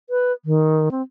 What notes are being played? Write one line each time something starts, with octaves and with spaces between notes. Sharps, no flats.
B4
D#3
C4